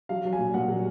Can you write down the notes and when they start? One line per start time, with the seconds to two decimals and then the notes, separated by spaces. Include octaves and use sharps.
0.09 F#3 F5
0.25 F#3
0.33 G#5
0.39 A#2
0.54 A#2 F#5
0.68 F#3